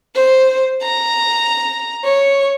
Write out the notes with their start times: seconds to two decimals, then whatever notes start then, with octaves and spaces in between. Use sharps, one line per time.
0.15 C5
0.82 A#5
2.04 C#5